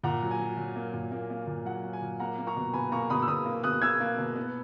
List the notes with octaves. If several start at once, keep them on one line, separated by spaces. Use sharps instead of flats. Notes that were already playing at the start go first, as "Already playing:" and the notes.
A#2 F#5 A#5
F#3
G#5
F#3
F#3
A#3
A#2
A#3
A#3
A#2
F#3 F#5
F#3
G#5
A#2
A#3 F#5 A#5
A#3
A#5 C#6
B2
B2 G#5 B5
A#3 A#5 C#6
B2 B5 D#6
E6
B2 B5 D#6
A#3
B2 D#6 F#6
A#3 E6 G#6
A#3
B2
B3